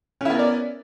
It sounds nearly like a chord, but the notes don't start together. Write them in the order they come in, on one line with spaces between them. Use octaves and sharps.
C#4 E4 B3 A#4 D5